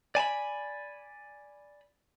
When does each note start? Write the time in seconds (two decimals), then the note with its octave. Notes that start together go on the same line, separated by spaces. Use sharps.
0.15 D5 G#5 A5 B5